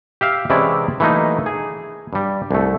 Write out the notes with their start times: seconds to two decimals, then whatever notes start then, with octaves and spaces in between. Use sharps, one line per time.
0.21 G4 E5 F5
0.50 C3 E3 G#3 C#4 E4 D5
1.00 E3 F#3 A3 A#3 D#4
1.46 G#4
2.13 G2 G3
2.51 C2 A3